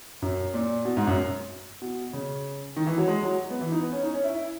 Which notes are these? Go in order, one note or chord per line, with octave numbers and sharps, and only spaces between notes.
F#2
A#2
B2
G#2
F#2
B2
C#3
D#3
E3
F#3
G#3
F#3
B3
E3
D#4
B3
C#4
D#4
C#4
E4
E4